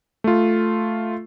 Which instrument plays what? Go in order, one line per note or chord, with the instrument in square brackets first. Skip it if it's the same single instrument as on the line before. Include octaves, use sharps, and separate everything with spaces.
[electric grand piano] A3 F4